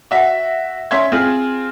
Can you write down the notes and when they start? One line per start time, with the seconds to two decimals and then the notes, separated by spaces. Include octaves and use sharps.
0.11 F#4 E5
0.91 C#4 E5 C6 G#6
1.12 C4 F4 G#4